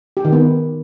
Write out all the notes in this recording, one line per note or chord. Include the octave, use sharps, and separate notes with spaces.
G4
D#3
B3